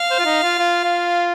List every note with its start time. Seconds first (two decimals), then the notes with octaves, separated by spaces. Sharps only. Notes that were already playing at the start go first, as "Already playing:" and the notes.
Already playing: F5
0.10 C5
0.19 F4
0.25 D#4
0.43 F4
0.59 F4
0.84 F4